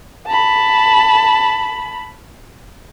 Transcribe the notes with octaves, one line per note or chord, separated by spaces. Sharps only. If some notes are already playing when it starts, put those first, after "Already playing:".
A5 B5